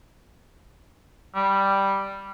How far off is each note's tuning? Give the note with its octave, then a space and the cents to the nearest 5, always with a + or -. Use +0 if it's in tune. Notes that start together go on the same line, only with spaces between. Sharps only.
G3 +0